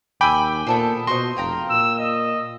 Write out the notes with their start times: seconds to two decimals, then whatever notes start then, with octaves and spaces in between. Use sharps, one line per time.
0.21 D#2 G5 G#5 B5 D6 E6
0.67 A#2 B3 A4 C5
1.07 B2 F#4 C5 D#5 C6
1.37 F1 F5 G5 A#5
1.70 A#2 E6
1.99 D#5